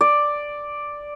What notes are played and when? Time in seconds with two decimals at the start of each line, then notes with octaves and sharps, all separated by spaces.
0.01 D5